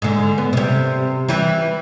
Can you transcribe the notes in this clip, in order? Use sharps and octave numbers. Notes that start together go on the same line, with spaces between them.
G#2 D3
B3
C3 G3
E3 G3